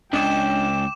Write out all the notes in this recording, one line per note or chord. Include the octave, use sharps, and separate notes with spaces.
C#2 D4 D#5 G5 D6 E7